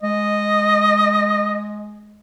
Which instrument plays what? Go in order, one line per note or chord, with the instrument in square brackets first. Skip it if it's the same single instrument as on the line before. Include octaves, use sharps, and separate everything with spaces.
[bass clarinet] G#3 [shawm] D#5